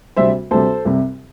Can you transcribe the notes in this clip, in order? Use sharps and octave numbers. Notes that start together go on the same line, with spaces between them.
D2 C3 G3 C5 E5
D2 C3 G3 A4 C5
C2 C3 G3